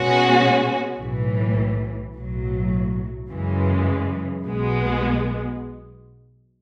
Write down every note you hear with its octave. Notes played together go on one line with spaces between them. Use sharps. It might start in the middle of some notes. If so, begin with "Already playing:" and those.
Already playing: B2 G#3 C#4 F#4
B1 A2 E3
B1 A2 F#3
F#2 C#3 E3 G#3
B1 B2 G#3 B3